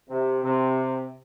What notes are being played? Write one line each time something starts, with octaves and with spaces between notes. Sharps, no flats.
C3
C3